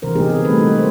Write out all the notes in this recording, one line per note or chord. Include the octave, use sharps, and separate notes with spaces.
C3 E3 A#4 C5
B3 D#4 G4 G#4
D3 C4 G#4
C3 G3 A3 C4 A4 B4
G#3 D#4 F#4
A#4 C5